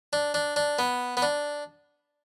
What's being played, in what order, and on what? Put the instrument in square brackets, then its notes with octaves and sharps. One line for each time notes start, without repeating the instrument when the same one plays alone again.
[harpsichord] D4
D4
D4
B3
B3
D4